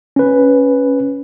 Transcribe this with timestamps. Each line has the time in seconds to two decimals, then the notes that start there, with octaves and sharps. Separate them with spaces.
0.16 C#4 B4